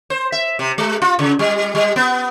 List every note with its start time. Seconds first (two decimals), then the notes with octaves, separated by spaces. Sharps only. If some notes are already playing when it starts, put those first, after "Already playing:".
0.10 C5
0.32 E5
0.59 C3
0.78 G#3
1.02 F4
1.19 C#3
1.39 G3
1.75 G3
1.96 B3